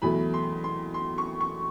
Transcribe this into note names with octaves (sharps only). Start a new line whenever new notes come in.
E2 B2 F#3 A3 B5
C6
C6
C6
C#6
C#6